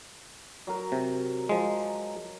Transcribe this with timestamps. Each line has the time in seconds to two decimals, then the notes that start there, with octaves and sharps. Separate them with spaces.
0.67 F#3 A#4
0.92 C3
1.49 F3 G#3